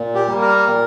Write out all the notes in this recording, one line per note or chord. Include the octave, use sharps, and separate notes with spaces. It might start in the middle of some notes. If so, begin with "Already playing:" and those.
Already playing: A#2
G4
G3 A#3
A#4
A#2